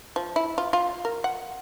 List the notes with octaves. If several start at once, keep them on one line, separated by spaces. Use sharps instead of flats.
F3
E4
F4
F4
A#4
F#5